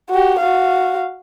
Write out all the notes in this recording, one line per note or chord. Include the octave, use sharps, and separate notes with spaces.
F#4 G4
F#4 F5